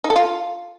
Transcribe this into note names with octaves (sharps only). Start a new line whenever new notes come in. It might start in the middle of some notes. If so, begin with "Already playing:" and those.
D#4
A4
F4